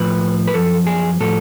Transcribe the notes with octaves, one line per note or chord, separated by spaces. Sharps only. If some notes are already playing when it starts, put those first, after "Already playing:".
Already playing: A2 F3 B4
B4
F#2 F3 A4
G#4
A2 F3 A4